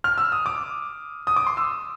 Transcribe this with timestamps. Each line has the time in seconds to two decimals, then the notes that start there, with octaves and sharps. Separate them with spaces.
0.04 F6
0.18 E6
0.32 D#6
0.46 D6
1.27 D#6
1.36 D6
1.47 C6
1.57 E6